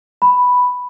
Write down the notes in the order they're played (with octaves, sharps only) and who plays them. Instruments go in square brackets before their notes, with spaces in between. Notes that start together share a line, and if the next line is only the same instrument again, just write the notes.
[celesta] B5